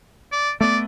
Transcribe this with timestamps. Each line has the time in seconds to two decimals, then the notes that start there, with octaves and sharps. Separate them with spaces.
0.32 D5
0.61 A3 B3 D5